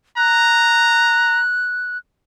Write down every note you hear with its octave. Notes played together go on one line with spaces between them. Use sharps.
A#5 F#6